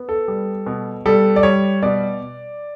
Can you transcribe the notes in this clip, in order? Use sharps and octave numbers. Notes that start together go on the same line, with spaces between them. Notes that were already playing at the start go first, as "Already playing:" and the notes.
Already playing: B3
A4
G3
B2
G3 A4
D5
G3 C#5
B2 D5